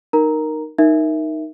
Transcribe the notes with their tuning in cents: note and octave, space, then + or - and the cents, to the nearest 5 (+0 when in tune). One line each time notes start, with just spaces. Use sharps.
D#4 -15 A#4 +0 A#5 +0
D#4 +0 A#4 +0 E5 +0